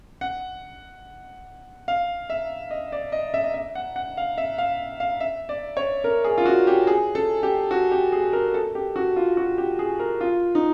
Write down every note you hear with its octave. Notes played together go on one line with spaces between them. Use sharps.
F#5
F5
E5
D#5
D5
D#5
E5
D#5
E5
F#5
F#5
F5
E5
F5
F5
E5
D5
C#5
A#4
G#4
F4
F#4
G4
G#4
A4
G4
F#4
G4
G#4
A#4
A4
G4
F#4
F4
F#4
G4
G#4
A#4
F4
D#4